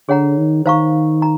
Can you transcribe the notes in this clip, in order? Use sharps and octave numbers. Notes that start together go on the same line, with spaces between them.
D3 G#4 C#5 F#5 A#5
D#3
D#3 C5 F5 A#5 C#6
A#5